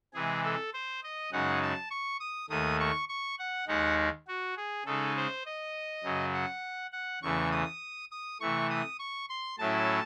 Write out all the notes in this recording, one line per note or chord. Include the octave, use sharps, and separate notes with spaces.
C3 E3 G#3 G#4
A4
C5
D#5
F#2 C#3 G#3 D#4 F#5
A5
C#6
D#6
D#2 D#3 A3 D#6
C#6
C#6
F#5
D#2 D#3 G#3 D#4 F#5
F#4
G#4
C#3 G#3 D#4 A4
C5
D#5
F#2 C#3 F#3
F#5
F#5
E2 C#3 E3 A3 C#6
D#6
D#6
C3 E3 A3 C#6
D#6
C#6
C6
A2 F#3 C#4 E4 A5